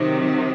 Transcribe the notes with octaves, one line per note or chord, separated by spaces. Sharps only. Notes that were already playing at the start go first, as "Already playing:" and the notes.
Already playing: C3 D#3 F#3